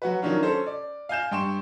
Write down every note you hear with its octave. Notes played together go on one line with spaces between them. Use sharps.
F#3 F#4 B4
D#3 F#3 C#4 D4 F4
C#4 A4 C5
D5
F5 G#5 G6 E7
G2 G5 C6 C#6 E7